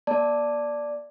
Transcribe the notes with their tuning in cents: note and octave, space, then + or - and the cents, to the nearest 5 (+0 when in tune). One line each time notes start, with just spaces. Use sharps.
A#3 +35 D5 +0 A5 +0